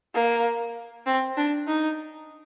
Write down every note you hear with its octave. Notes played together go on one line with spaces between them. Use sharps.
A#3
C4
D4
D#4